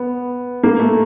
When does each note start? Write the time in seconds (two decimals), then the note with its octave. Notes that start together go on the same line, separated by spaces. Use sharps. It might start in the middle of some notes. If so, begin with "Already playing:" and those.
Already playing: B3
0.63 A#3
0.79 A3